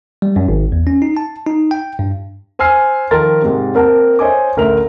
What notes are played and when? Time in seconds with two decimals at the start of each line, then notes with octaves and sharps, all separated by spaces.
0.22 G3
0.36 F#2
0.48 G#1
0.72 E2
0.87 C#4
1.02 D#4
1.17 A5
1.47 D#4
1.71 G5
1.99 G2
2.59 C5 G#5 E6 F6 C7
3.11 D#3 F3 A#4 A5 C6 A6
3.42 G#2 C3
3.74 A#3 C4 A#4 F#5 A5
4.19 C5 C#5 D#5 E5 G#5 D6
4.56 A1 D2 A#4 E5 F7